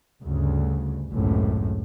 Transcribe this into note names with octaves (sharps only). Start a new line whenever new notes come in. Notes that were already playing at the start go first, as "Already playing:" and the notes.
D2 G2 C#3
G#1 C#2 F#2 A2